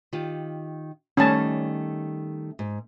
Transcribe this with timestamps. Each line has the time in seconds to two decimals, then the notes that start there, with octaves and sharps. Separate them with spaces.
0.13 D#3 F4 G4
1.17 D#3 G3 A3 C#4 A5
2.59 G#2